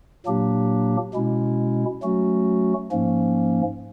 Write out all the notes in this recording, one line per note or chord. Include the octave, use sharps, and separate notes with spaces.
A#2 F#3 A#3 D4 G4
B2 G#3 C#4 E4
F#3 A3 C#4 F#4
G#2 F3 A#3 C#4